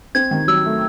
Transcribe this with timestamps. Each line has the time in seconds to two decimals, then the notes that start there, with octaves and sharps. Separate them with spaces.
0.15 C4 G#6
0.31 D#3
0.48 F#3 E6
0.65 A3